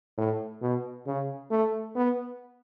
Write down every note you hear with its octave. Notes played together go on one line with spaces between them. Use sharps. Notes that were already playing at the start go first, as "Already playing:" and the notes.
A2
B2
C#3
A3
B3